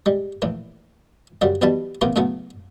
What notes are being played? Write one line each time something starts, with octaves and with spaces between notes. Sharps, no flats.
G3 G#3
A#1 A2 E3
F#2 C#3 F#3 G3
B1 B2 E3 G3 A5 B5
A2 C#3 E3 A#3 B3 F4
A2 C#3 F#3 A3 B3